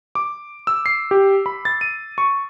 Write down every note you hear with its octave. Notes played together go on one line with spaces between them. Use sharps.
D6
E6
C7
G4
B5
A6
D#7
C#6